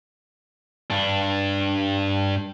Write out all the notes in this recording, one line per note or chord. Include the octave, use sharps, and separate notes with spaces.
G2 D4